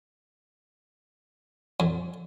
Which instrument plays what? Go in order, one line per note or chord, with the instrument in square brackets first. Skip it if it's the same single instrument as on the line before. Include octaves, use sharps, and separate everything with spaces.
[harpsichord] F2